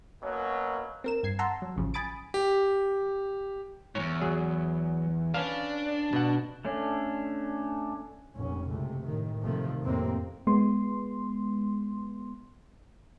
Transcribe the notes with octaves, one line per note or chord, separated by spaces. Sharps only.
B2 F#3 A#3 C#4
C4 A#4 E7
G2 G#6 C7
F#5 A5 A#5 C6 E6
F#3
A1 C#3 F3
G#5 B5 D#6 A6 D7
G4
E2 G#2 C#5
F#3 G#4
C#4 D4 B4 F5
B2 F#5
A3 C#4 D4
F1 A#1 C#4
F#1 C#2 C3 A3
A2 D#3
C3 D#3 F3 A3
F2 A2 C3 A#3 C4
G#3 B3 C6